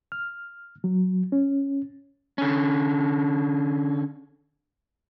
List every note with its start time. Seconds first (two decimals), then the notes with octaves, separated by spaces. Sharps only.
0.12 F6
0.84 F#3
1.32 C#4
2.38 D3 C#4